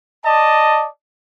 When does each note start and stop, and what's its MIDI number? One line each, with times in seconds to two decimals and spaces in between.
0.25 0.87 74
0.25 0.87 75
0.25 0.87 81